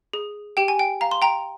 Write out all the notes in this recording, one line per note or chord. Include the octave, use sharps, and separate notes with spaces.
G#4
G4 G5
G#5
G5
F5 A#5
C6
G5 A#5